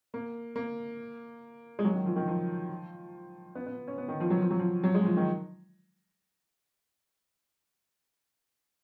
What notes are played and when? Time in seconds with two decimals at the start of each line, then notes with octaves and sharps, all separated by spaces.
0.14 A#3
0.56 A#3
1.79 G#3
1.84 F#3
1.95 D#3
2.06 F3
2.16 D#3
2.27 F3
3.55 B3
3.66 B3
3.88 C#4
3.98 B3
4.08 D#3
4.20 F3
4.30 F#3
4.41 F3
4.51 F#3
4.59 F3
4.84 F#3
4.95 G#3
5.05 F3
5.17 D#3